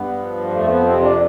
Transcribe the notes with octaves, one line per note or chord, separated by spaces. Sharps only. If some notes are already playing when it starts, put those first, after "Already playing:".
Already playing: G2 B3
F3
F2 A3
B3
C3 C4
D4